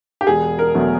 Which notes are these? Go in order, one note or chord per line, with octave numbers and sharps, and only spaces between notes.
G4
E1 G#4
A#4
E2 B2 F#3 A3